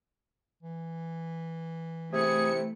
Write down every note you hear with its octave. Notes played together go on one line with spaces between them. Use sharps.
E3
C3 A3 E4 G#4 C#7